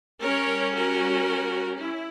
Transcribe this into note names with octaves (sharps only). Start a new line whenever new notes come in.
G3 C#4 A#4 C#5
F#4 A#4
E4